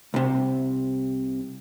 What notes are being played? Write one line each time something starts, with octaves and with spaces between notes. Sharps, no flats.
C2 C3